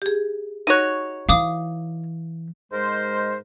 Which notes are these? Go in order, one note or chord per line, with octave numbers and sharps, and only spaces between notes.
G4 G#4
D#4 F#4 C#5 F#6 D#7
E3 F5 D6 D#6
G#2 G#3 A#4 C5